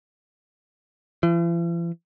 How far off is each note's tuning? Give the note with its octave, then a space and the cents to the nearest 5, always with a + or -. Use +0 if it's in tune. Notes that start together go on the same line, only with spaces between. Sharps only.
E3 +45